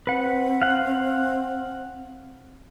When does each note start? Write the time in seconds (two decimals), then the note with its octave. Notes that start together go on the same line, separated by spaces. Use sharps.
0.07 C4 B4 F#5
0.62 F5 F#5